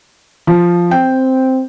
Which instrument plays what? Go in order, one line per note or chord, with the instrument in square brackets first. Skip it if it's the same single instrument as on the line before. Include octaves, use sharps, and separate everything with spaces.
[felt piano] F3
[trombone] C4 [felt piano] G5